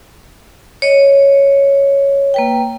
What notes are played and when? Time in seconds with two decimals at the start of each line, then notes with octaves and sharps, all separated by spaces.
0.82 C#5 D#5
2.34 A#3 B4 G5